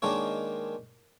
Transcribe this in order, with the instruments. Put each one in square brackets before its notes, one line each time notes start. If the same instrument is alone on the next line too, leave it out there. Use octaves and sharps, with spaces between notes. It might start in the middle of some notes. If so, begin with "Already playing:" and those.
[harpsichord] D#3 G#3 A#3 D4 F4 C#5